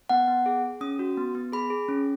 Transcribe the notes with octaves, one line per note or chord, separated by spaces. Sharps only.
B3 F#5
B3
G#4
G#4
C#4 D#6
F#4
B3
B3
G#4 B5
G#4
C#4